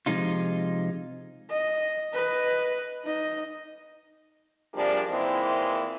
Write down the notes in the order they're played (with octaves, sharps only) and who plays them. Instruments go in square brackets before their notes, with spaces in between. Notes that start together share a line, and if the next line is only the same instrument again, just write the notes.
[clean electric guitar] C3 F3 G#3 D#4 F4
[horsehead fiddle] D#5
B4 D#5
D#4 D#5
[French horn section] C3 F3 G3 A#3 D4 G#4
A#2 D#3 E3 G#3 C4